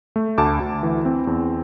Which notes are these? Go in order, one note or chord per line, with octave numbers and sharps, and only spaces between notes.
A3
D2 A5 D6
D2
E3
C4
E2